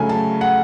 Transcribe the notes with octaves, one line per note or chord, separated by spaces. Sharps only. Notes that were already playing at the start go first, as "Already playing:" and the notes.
Already playing: C#3 F#3 A3 G#5
A5
F#5